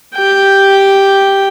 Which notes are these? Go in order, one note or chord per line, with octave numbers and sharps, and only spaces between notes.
G4 G5